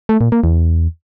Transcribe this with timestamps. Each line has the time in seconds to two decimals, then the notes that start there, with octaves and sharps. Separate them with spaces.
0.09 A3
0.21 A#2
0.32 A#3
0.44 E2